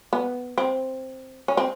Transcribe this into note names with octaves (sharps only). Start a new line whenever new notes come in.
B3
C4
C#4
C4